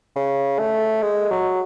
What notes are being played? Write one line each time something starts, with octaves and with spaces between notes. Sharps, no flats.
C#3
A3
G#3
F#3